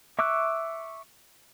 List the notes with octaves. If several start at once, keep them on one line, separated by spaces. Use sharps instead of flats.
E5 C#6 D6 E6 F#6